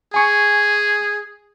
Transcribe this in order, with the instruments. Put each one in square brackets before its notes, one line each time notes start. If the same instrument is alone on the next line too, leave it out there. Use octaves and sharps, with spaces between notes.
[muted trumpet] G#4 [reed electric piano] G#5 C#6